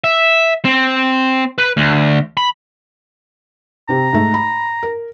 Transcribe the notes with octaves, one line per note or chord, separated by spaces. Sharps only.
E5
C4
B4
D2
B5
C3 C4 G4 A#5
G#2 A3
B5
A#4